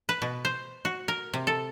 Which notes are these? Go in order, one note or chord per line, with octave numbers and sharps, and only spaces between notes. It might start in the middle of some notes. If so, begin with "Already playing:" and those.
B4
B2
C5
F#4
A#4
C3
A4